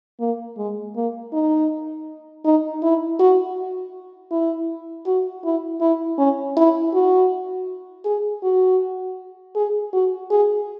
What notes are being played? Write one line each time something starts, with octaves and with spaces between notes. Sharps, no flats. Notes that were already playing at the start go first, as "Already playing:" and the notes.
A#3
G#3
A#3
D#4
D#4
E4
F#4
E4
F#4
E4
E4
C#4
E4
F#4
G#4
F#4
G#4
F#4
G#4